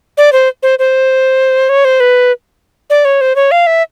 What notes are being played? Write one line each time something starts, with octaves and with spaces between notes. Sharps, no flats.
D5
C5
C5
C5
C#5
C5
B4
D5
C#5
C5
C#5
F5
E5